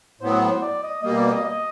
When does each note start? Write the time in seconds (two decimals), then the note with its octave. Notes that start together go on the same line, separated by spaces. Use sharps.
0.21 A2 F#3 B3 C5
0.62 D5
0.83 D#5
1.03 B2 G3 A#3 D#5
1.17 D5
1.31 D#5
1.45 D#5